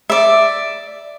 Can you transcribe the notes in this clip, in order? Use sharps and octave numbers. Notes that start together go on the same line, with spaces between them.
D5 E5